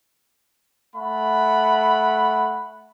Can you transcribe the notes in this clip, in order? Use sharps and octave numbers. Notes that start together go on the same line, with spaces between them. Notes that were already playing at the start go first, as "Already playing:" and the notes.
A3 F#5 B5